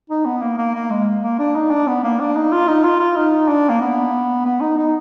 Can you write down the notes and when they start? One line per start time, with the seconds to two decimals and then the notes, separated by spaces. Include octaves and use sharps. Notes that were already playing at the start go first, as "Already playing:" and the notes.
0.10 D#4
0.25 B3
0.41 A#3
0.58 A#3
0.74 A#3
0.90 G#3
1.23 A#3
1.39 D4
1.55 D#4
1.70 D4
1.87 B3
2.04 A#3
2.20 D4
2.36 D#4
2.51 F4
2.68 D#4
2.84 F4
2.99 F4
3.16 D#4
3.48 D4
3.69 A#3
3.81 B3
4.45 B3
4.61 D#4
4.77 D#4